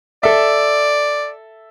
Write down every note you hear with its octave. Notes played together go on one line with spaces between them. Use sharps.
A4 D5 E5